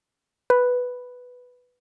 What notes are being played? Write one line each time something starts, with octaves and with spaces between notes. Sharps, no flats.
B4